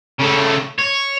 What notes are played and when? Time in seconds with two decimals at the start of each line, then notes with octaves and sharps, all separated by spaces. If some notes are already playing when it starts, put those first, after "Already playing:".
0.20 C#3 A3
0.79 C#5